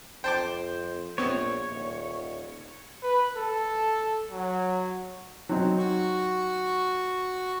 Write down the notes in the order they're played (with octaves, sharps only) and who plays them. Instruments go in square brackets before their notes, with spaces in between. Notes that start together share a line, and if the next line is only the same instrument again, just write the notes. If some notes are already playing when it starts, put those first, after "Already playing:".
[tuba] F2 [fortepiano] C5 [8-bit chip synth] G5 A5 D6
[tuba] A#1 [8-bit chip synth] B3 C4 [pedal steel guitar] C#5
[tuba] D#1
[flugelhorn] B4
A4
F#3
[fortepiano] F#3 C4 D#4
[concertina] F#4 C#6